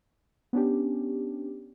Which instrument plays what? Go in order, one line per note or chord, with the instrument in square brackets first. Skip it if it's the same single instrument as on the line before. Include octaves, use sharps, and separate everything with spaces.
[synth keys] B3 C#4 D4 G4